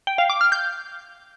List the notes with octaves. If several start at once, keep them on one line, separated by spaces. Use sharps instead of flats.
G5
F5
D6
F6
G6